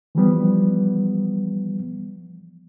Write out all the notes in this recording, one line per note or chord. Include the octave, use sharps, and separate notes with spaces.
E3 F3 G3 B3